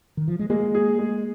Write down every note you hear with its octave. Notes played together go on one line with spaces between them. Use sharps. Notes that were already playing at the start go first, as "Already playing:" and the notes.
D#3
F3
G#3
G#3 A#3
G#4
G#3